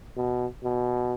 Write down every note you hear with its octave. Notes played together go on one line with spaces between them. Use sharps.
B2
B2